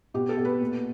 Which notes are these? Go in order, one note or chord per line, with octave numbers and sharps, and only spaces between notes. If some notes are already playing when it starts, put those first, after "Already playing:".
B2 G4
A4
B2
B4
A#2